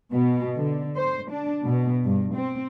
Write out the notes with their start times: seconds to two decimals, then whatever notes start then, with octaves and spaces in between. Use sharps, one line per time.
0.13 B2
0.55 D3
0.97 C5
1.31 D4
1.65 B2
2.05 G2
2.34 C4